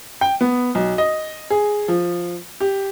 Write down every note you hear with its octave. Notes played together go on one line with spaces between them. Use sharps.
G5
B3
B1
D#5
G#4
F3
G4